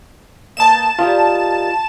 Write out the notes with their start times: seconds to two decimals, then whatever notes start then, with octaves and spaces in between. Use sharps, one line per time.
0.57 A#3 D#4 B4 A5 E7
0.99 G3 F4 A#4 D#5